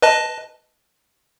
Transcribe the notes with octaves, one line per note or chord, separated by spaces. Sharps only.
B4 D#5 A5